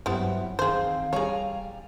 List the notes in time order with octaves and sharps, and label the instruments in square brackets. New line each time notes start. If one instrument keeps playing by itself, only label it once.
[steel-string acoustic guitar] G2 E4 F#5 [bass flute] F#3 [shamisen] B3 C4 G4
[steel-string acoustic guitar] D#3 C4 [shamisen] G#4 C5 [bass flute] F5
[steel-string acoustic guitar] G3 G#5 A#5 [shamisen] G#4 C#5